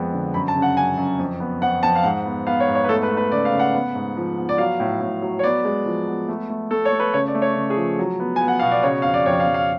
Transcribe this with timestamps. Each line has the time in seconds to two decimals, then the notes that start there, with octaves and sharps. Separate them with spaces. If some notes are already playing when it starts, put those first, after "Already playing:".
Already playing: F2 G#3 B3
0.13 D3
0.34 F#2 B5
0.48 A5
0.55 C#3
0.62 F#5
0.76 F#2 G#5
0.98 F#2
1.19 F2
1.40 B3
1.61 F2 F#5
1.83 F2 A5
1.96 F5
2.04 G#2 F#5
2.25 B3
2.47 B3 F5
2.60 C#5
2.68 G#2
2.75 C#5
2.84 B4
2.89 A3 A4
3.03 B4
3.10 A3
3.17 B4
3.32 C#3 D5
3.45 F5
3.53 C#3
3.59 F#5
3.74 B3
3.95 G#2
4.17 F3
4.37 B3
4.49 D5
4.58 F#3 F5
4.80 A2
5.01 A2
5.22 F#3
5.39 C#5
5.43 B3 D5
5.65 G#3
5.86 F3
6.07 B3
6.28 A3
6.50 A3
6.71 A3 A4
6.85 C#5
6.92 A3
7.00 B4
7.14 C#3 C#5
7.28 D5
7.35 A3
7.42 C#5
7.56 C#3
7.70 G#4
7.77 F3
7.99 F#3
8.20 B3
8.36 B3 G#5
8.48 F#5
8.59 B2 F5
8.71 D5
8.83 C#3 C#5
9.02 F2 F5
9.14 D5
9.26 F2 C#5
9.40 F5
9.47 F2
9.54 F5